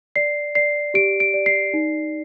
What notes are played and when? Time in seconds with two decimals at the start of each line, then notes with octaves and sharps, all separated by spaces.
0.16 D5 C7
0.55 D5 C7
0.94 G4 D7
1.20 D7
1.34 D5
1.46 C7
1.74 D#4